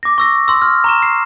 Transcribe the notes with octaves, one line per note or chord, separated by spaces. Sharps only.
D6 A#6
C#6 E6 A#6
C6 E6
F6
A#5 C#6 E7
C7